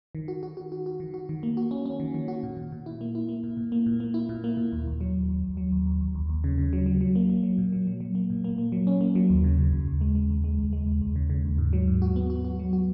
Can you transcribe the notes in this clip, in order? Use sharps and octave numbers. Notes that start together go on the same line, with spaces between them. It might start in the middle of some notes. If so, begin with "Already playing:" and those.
D#3
F#4
F#4
F#4
F#4
F#4
D#3
F#4
D#3
A#3
F#4
C#4
C#4
D#3
D#3
F#4
A#2
A#2
A#2
E4
A#3
E4
A#3
A#2
A#2
A#3
A#2
A#3
E4
A#2
A#3
A#2
D#2
D#2
F#3
D#2
D#2
D#2
F#3
D#2
D#2
D#2
D#2
D#2
C#3
C#3
F#3
F#3
F#3
A#3
A#3
F#3
A#2
F#3
F#3
F#3
A#3
A#2
A#3
A#3
F#3
C#4
A#3
F#3
D#2
C#3
C#3
D#2
D#2
G#3
G#3
D#2
G#3
D#2
G#3
D#2
D#2
C#3
C#3
D#2
G#2
F#3
G#2
F#4
B3
F#4
F#4
F#3
F#4